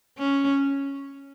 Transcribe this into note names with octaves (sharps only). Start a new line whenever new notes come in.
C#4